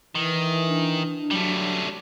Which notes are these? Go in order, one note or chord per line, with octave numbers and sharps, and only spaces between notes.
D#3 E3
D4
F#3 G3 A3